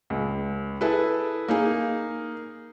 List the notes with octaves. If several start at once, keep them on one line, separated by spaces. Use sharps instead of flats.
C#2
E4 G#4 A4 B4
A#3 D#4 G#4